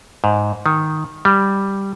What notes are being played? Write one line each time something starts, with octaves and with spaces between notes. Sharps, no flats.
G#2
D#3
G3